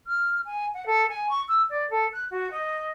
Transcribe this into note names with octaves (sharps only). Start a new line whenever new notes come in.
F6
G#5
F#5
A4
G#5
C#6
E6
D5
A4
F#6
F#4
D#5